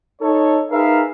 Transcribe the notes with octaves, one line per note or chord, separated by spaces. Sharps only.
D#4 A4 C#5
D#4 G#4 A#4 B4 E5 F5